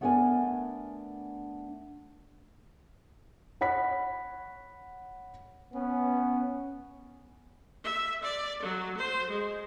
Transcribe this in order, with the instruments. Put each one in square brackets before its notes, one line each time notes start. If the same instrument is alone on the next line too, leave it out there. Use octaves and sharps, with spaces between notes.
[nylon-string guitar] A3 B3 D4 A#4 D5 G#5
[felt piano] C#5 F#5 B5 B6
[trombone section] B3 C#4
[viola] E5
D5
F#3
C5
G#3